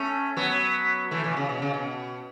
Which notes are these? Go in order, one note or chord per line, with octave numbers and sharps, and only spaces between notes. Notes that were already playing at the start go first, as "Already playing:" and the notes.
Already playing: A3 C#4
F#3 B3
E3 A3
B2 E3
C#3
B2
C#3
B2